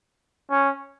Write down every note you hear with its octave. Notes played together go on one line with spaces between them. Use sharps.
C#4